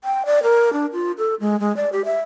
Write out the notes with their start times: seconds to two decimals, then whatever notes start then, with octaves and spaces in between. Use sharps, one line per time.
0.04 G5
0.26 D5
0.43 A#4
0.73 D4
0.93 F4
1.18 A4
1.40 G#3
1.60 G#3
1.77 D5
1.93 G4
2.05 E5